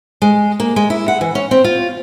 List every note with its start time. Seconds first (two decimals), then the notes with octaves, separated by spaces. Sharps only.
0.22 G#3
0.60 A#3
0.76 G#3
0.90 E4
1.08 F#5
1.21 E3
1.35 C#4
1.51 C4
1.64 F4